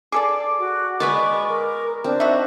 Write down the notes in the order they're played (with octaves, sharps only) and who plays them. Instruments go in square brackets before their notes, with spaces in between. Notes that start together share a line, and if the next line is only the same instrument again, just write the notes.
[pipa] G#4 A4 D5 [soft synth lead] D6
[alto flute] F#4
[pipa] B2 B3 [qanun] G#3 B4 D5 [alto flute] C#6
[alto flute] A#4
[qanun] C4 [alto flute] D4
[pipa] D#4 F#4 [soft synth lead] E5